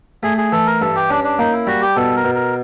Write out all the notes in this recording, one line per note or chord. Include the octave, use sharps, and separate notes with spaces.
A3 G#4
G#4
E3 A4
A#4
G2 A4
G4
C#4 D4
D4
A#3 D#4
E4
G3 F#4
G4
B2 A4
A#4
B2
A#4